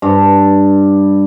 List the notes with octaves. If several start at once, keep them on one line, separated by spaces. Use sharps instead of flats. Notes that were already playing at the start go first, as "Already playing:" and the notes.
G2